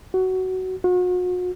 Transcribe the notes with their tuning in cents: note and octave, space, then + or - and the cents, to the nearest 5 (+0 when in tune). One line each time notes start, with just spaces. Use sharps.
F#4 +15
F#4 -40